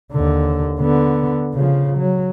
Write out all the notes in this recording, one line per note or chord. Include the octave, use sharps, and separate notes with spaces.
D#2 D3
D3 B3
C#3 F3
F#3